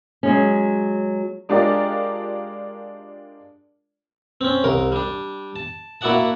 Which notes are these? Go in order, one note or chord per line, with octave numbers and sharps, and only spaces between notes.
F#3 G#3 C#4
G#3 D4 F4 G4 A#4 D5
C4 C#4
C2 A#4
G3 D4
A5
A#3 E4 F#4 D5 F#5 A5